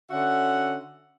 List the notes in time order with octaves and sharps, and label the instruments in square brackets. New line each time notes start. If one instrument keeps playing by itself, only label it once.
[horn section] D3 C#4 F#4 E5 F#5